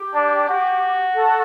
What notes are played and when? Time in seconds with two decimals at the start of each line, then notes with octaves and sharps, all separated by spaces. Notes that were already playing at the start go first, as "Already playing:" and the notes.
Already playing: G4
0.14 D4
0.49 F#4
1.14 A4